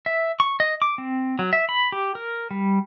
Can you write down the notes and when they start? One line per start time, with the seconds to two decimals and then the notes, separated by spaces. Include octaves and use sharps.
0.06 E5
0.40 C#6
0.60 D#5
0.82 D6
0.98 C4
1.39 F#3
1.53 E5
1.69 B5
1.92 G4
2.15 A#4
2.51 G3